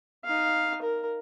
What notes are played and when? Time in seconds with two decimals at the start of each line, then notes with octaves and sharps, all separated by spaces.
0.25 D#4 F5
0.82 A#4